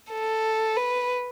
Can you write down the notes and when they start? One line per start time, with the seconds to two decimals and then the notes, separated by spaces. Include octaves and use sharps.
0.12 A4
0.77 B4